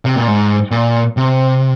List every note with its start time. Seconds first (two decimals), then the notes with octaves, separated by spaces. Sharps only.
0.05 C3
0.16 A#2
0.27 G#2
0.71 A#2
1.17 C3